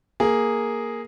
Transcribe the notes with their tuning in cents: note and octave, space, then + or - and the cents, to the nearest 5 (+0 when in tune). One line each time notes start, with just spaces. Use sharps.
A#3 +0 G#4 +0